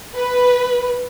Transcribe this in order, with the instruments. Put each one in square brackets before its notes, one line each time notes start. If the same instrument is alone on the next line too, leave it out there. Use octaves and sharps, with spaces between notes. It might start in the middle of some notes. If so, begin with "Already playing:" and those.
[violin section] B4